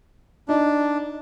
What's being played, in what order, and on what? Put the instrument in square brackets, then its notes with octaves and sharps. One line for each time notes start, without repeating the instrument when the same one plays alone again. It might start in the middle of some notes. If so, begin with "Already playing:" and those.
[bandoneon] D4 [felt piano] D#4